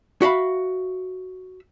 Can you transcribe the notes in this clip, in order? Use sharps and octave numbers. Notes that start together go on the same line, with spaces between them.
F#4 E5 F5 B5